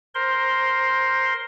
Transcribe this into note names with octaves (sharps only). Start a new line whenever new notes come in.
A#4 C5 C6